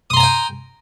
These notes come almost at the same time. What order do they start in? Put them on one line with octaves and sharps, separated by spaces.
D#6 C6 A#5 G#5 G5